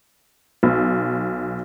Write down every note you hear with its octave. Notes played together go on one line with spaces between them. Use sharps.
B1